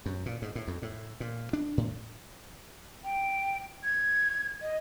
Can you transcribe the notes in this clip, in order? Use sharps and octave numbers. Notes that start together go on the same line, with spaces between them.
F#2
A#2
G#2
A2
F2
A2
A#2
D4
A2
G5
G#6
D#5